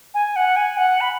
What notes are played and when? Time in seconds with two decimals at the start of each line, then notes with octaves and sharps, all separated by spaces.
0.14 G#5
0.36 F#5
0.56 G#5
0.77 F#5
1.00 B5